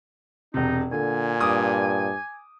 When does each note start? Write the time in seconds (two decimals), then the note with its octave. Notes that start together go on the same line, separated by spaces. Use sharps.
0.54 E1 C3 D#4
0.92 A#2 D3 G#5
1.41 G2 D6 D#6